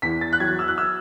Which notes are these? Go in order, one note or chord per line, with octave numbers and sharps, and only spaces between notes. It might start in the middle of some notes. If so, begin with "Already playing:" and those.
E2 B6
A6
F#6
F#3 G#6
E6
F#6
E6